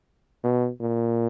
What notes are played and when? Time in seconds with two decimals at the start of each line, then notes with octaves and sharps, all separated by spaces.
0.44 B2
0.81 A#2